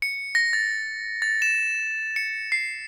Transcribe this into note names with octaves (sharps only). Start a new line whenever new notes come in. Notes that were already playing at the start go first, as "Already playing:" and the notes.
C#7
A#6
A6
A6
E7
C#7
C7